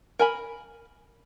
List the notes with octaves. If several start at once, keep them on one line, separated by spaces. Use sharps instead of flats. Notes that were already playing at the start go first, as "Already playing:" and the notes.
A#4 G#5 B5